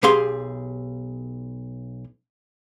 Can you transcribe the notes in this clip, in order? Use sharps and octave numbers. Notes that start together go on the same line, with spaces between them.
B1 G4 G#4 F5 C6